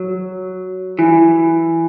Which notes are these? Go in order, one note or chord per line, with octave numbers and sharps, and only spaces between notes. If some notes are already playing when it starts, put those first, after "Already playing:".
Already playing: F#3
E3